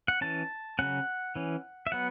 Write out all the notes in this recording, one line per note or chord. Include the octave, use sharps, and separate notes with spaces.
F#5
E3 C#4 A5
C#3 F#3 C#4 F#5
E3 C#4
E5
F#3 B3 F#5